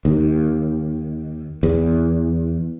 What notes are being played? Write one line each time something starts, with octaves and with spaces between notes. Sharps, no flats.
D#2
E2